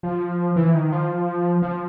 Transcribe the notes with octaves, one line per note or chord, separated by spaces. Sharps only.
F3
E3
D#3
F3
F3